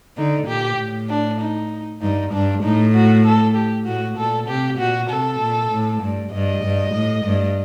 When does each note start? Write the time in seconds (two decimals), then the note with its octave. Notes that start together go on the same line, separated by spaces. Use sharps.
0.17 D3 D#4
0.48 A#2 G4
0.79 A2
1.09 D4
1.40 D#4
2.02 G2 D#4
2.33 G2 D4
2.64 A2 D#4
2.95 F#4
3.25 A4
3.56 G4
3.86 A2 F#4
4.18 A#2 A4
4.48 C3 G4
4.79 A#2 F#4
5.10 C3 A4
5.40 A#2
5.72 A2
6.02 G2
6.33 G2 D#5
6.64 G2
6.95 A2
7.25 G2